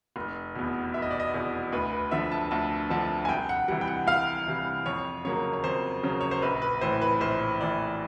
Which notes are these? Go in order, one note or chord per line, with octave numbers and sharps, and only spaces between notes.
F1
E2 B2
F1 E5
D#5
D5
D#5
E2 B2
D2 B4
B4
D3 F3 E5
A5
D2 A5
D3 F3 A5
G#5
C2 G5
F#5
C3 E3 G3 F#5
G5
F#5
C2 F5
C3 E3 G3
F2 C#5
C#3 F#3 A#3 C#4 C#5
C#5
F2 C5
C#3 F#3 A#3 C#4
C#5
C5
A#1 B4
B4
A2 E3 C5
B4
A#1 C5
A2 E3 D5